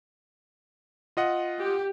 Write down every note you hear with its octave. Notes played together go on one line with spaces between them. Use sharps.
F4 D#5 F#5
G4